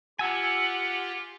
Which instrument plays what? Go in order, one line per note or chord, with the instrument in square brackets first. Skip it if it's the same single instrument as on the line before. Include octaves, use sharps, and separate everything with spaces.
[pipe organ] F4 G4 [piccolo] F#5 [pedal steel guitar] G#5 E6